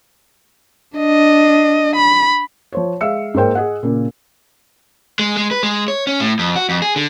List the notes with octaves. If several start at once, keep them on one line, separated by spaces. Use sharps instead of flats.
D4 D#5
B5
F3 C5 C#5
G#3 E5 F5 E6 C#7
G#2 A#3 A#4 C5 G5
G#4 D#5 F#5
A#2 C#3 A#3
G#3
G#3
B4
G#3
C#5
C#4
A2
F2
F#4
F2
G#4
D3